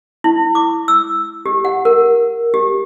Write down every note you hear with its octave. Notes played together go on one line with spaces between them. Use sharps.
E4
D6
E6
G4
F#5
A#4
G4